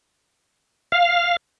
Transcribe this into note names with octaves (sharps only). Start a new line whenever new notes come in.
F5